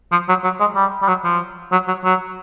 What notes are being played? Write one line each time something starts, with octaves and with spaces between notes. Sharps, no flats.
F3
F#3
F#3
G#3
G3
G3
F#3
F3
F#3
F#3
F#3